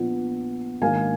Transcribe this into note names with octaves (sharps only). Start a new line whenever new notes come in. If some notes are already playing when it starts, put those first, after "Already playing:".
Already playing: A#2 F3 B3 D4
G#2 D#3 A#3 D4 F5 G#5